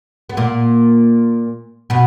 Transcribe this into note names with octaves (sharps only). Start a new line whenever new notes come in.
B3
A#2 A#3
B2 B3